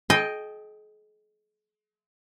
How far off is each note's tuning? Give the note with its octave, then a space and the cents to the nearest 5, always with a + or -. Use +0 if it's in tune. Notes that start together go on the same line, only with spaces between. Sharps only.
G#4 +45 D#5 +0 G5 +0